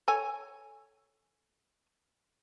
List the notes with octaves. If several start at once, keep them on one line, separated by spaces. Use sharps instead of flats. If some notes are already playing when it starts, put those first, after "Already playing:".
A4 C#5 G#5